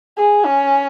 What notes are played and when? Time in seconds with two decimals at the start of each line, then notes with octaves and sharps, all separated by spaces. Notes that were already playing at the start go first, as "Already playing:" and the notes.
0.17 G#4
0.46 C#4